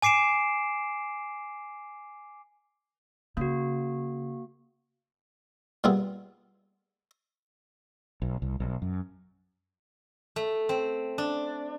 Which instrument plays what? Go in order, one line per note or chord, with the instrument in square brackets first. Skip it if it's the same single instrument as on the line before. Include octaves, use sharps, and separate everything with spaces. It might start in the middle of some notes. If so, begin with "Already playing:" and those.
[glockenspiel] G#5 D6 C7 D7 E7
[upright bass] C#3 [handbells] A#3 F#4
[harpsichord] A#2 G3 B3 E4 F4 G#4
[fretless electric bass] B1
C2
B1
F#2
[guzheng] A3
C4
D4